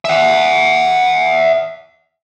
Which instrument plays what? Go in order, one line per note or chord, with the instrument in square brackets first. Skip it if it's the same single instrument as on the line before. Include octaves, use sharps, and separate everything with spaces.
[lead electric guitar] E5 F#5